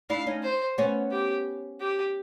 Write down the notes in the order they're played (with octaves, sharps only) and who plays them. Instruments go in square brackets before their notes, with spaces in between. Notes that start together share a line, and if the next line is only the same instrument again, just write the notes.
[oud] D4 E4 [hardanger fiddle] F5
[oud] C#4 D#4
[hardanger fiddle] C5
[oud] B3 C#4
[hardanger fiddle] G4
G4